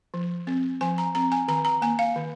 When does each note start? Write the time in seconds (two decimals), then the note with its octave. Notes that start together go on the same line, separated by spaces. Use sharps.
0.14 F3
0.47 C4
0.81 F3 G#5
0.98 A#5
1.15 C4 A#5
1.32 G#5
1.48 D#3 A#5
1.65 A#5
1.82 A#3 G#5
1.99 F5
2.16 D#3